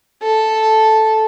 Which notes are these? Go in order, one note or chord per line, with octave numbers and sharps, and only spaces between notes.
A4